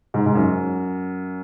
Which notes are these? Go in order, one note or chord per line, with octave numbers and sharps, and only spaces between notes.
G#2
G#2
F#2